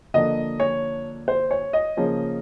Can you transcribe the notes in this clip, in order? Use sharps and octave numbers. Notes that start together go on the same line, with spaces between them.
D3 F3 A#3 D#5
C#5
C5
C#5
D#5
C#3 F3 A#3 C#4